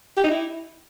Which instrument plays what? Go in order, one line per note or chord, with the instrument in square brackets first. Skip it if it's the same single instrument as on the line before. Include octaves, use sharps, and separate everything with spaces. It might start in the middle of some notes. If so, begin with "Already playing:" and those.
[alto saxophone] G4
D#4
E4